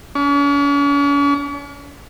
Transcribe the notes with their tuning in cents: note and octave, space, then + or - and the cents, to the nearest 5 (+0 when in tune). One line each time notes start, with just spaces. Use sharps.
C#4 +45